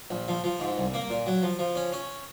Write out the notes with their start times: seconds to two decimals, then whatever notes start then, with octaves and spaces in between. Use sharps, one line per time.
0.11 A#1
0.28 F3
0.44 F3
0.60 G#2
0.78 C2
0.94 A#3
1.10 A#2
1.26 F#3
1.43 F3
1.59 F3
1.75 C#4
1.92 C#4